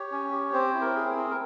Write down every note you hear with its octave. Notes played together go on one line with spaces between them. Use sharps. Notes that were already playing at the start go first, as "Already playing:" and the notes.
Already playing: G4 C#5
C#4
G4
C4 C5
E4
A#4
G#4
C4
A#4